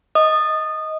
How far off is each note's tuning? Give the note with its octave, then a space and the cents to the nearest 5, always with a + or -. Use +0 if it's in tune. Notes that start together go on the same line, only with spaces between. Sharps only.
D#5 +15 D#6 -20